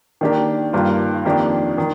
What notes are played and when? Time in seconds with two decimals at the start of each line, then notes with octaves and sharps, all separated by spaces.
0.21 D#3 A#3 D4 G4
0.73 G2 D#3 A#3 F4
1.25 F2 D#3 A#3 D4 G4
1.78 D#3